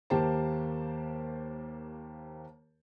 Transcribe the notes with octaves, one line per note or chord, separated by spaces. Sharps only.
D#2 A#3 G4 C5 A5